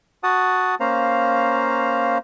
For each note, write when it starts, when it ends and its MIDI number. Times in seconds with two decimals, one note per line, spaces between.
0.23 0.75 66
0.23 0.75 78
0.23 0.75 81
0.23 0.75 87
0.80 2.18 58
0.80 2.18 61
0.80 2.18 72
0.80 2.18 77
0.80 2.18 82